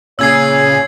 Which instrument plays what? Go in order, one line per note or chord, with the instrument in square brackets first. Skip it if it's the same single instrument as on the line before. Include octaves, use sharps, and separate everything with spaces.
[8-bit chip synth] A#2 C#3 G#4 [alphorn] C#5 [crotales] E6 G#6 C7